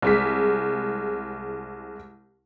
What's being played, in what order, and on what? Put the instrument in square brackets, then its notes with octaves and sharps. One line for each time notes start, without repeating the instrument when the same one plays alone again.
[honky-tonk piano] C2 G#3 B6